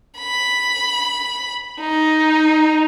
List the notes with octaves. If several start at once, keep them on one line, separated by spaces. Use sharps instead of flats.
B5
D#4